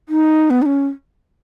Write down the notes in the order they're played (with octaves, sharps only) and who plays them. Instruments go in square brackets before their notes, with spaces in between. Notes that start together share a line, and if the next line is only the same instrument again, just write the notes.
[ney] D#4
B3
D#4
C#4